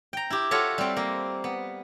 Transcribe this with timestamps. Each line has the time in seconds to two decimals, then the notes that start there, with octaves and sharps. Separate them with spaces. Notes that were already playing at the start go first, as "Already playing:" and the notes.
0.13 G5 A#5
0.30 E4 G4
0.51 F4 F#4 A4 C#5 E5
0.78 G3 C4
0.97 A#3
1.44 B3